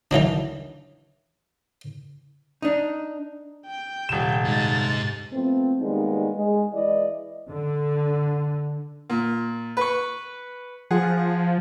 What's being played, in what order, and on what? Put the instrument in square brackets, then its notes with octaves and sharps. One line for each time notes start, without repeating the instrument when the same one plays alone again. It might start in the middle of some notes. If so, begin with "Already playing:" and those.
[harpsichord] D#3 E3 F#3 D4
[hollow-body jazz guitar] D4 D#4
[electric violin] G5
[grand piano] D#1 E7 [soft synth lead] C3
[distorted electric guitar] G#2 D#4 [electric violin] A6
[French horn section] F3 A3 B3 C4
D#2 G3 G#3 B3 D4 D#4
G#3
E3 G#3 E4 D5 D#5
[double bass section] D3
[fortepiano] A#2
B4 C#6
[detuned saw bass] F3 [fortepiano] G#4 F#5